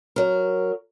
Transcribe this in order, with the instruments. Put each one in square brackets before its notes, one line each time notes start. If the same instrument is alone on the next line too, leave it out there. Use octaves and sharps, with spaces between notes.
[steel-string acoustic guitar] F#3 A#4